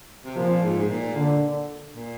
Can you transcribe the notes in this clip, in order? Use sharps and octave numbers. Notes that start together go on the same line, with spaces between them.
C3
A#2 F3
G#2
G#2
A#2
D3
A#2